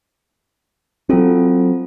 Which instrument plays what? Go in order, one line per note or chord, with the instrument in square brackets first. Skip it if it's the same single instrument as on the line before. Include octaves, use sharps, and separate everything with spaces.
[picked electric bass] F#3 C4 [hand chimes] F4 A4 C5